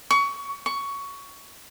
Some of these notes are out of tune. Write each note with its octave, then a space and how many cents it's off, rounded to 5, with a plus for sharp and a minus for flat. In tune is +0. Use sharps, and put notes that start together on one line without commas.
C#6 +25
C#6 +15